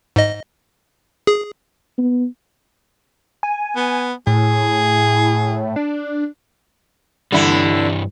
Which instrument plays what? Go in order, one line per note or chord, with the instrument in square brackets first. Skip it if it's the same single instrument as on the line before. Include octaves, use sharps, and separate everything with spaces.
[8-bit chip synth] G#2 D#5
G#4
[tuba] B3
[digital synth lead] G#5
[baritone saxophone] B3
[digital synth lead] A2 [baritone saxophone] G#4
[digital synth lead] D4
[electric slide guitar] G2 E3 G3 [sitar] D3 E4